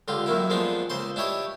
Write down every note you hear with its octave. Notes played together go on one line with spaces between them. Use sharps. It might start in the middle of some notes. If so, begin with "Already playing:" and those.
C#2 D3 F4 G4
F#2 D#3 A#3 E4
F3 G#3 A#3 B3 D4 D#4
C#2 C#3 C5 C6
D4 E4 G4 C#5 D#5